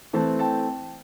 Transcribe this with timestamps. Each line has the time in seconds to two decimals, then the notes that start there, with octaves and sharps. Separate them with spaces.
0.13 E3 A3 C4 A5
0.39 G5 A5